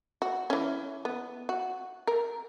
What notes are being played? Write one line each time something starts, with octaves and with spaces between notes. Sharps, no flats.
F#4
E3 C#4
B3
F#4
A#4